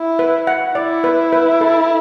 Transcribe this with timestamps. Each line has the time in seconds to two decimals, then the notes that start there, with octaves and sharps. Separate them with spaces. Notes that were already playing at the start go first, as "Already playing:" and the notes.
Already playing: E4
0.19 B4
0.47 F#5
0.75 E4 D5
1.04 B4
1.33 B4
1.61 A4